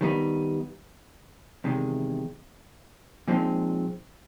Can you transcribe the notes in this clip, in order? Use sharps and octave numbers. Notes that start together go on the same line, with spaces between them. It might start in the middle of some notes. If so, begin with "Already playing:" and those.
D#3 G3 B3 D#4
E2 C3 D#3 G#3
A#2 F3 G#3 C4 D#4